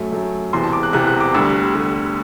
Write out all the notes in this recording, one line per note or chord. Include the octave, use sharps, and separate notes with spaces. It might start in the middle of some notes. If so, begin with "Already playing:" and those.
Already playing: F#2 F#3 A3
F#2 F#3 A3
E1 E2 C3 C6
A5
D6
F#6
E1 E2 C3 F#6
F#6
D6
D2 D3 G3 E6
D2 D3 G3